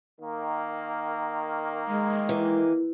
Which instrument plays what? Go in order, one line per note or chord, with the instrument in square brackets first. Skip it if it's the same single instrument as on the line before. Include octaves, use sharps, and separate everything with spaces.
[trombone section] D#3 A#3
[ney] G#3
[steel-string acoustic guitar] E3